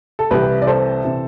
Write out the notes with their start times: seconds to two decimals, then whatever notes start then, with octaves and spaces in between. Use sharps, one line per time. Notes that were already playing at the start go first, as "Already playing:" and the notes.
0.19 A4
0.31 C2 C3 E3 G4 B4
0.62 D5
0.67 A4 C5
1.04 C3 E3